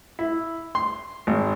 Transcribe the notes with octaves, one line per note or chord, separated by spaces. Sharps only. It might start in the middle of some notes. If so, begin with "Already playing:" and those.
E4
C6
G#1